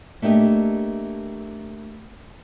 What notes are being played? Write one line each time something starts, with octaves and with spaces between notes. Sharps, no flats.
A3 A#3 D4 G4 D#5